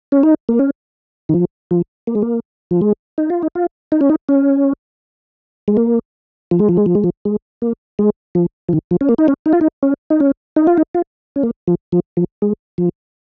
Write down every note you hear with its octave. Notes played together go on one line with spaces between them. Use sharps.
C#4
D#4
A#3
C#4
D#3
F3
F3
A#3
G#3
A#3
F3
G#3
D#4
F4
D#4
F4
D#4
C#4
D#4
C#4
G#3
A#3
F3
G#3
F3
G#3
F3
G#3
F3
G#3
A#3
G#3
F3
F3
D#3
F3
C#4
A#3
D#4
C#4
D#4
F4
D#4
C#4
D#4
C#4
D#4
F4
D#4
F4
C#4
A#3
F3
F3
F3
G#3
F3